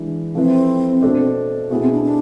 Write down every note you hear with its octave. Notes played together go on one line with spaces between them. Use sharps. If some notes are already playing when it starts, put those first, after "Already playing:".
Already playing: E3 G#3 D4
F3 A3 C4 E4 B4
B2 A3 D4 A4 C5
B2 A3 B3 E4 G#4
C4
D4
D4